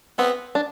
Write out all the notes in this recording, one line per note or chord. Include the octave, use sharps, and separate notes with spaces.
B3 C4
D4